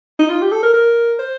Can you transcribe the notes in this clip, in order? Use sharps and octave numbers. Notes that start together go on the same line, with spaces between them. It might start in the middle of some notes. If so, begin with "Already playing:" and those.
D#4
F4
G4
A4
A#4
A#4
C5